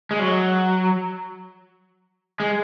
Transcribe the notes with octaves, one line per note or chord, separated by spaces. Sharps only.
G#3
F#3
G#3